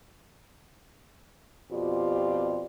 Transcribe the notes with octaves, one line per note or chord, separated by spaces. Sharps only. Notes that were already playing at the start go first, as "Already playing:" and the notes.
F2 B2 C4 F4 G4 D5